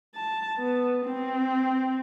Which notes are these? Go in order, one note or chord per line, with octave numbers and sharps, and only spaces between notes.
A5
B3
C4